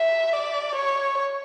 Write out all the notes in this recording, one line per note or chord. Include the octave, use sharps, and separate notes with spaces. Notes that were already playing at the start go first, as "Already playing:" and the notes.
Already playing: E5
D5
C#5